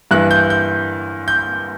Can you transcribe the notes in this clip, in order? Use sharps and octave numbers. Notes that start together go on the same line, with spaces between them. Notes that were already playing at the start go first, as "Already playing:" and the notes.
G2 E3 F#6
G6
G6
G6